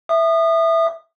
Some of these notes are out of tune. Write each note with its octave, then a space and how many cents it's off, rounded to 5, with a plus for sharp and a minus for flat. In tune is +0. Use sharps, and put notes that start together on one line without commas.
E5 +0 D#6 -30